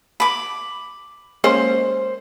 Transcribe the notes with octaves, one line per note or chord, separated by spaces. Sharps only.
B5 D6
G#3 A#3 C#4 C5